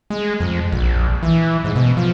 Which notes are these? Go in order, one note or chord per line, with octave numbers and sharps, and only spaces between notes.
G#3
F2
A#1
E3
G#2
B2
F3